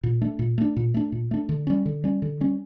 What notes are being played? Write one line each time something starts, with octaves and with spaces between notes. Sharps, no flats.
A#2
A3 D4
A#2
A3 D4
A#2
A3 D4
A#2
A3 D4
D3
G3 C#4
D3
G3 C#4
D3
G3 C#4